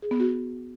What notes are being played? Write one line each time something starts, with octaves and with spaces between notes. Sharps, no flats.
G#4
B3
F#4